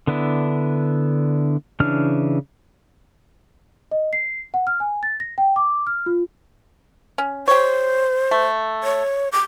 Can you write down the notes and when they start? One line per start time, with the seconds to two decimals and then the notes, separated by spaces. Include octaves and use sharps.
0.07 D3 B3 D4 E4
1.80 C#3 E3 D4 F6
3.91 D#5
4.13 C7
4.54 F#5
4.67 F6
4.80 G#5
5.03 A6
5.20 A#6
5.38 G5
5.56 D6
5.87 F6
6.06 F4
7.18 C#4
7.48 G4 C5 C#5
8.31 A3
8.84 C#5
9.32 D6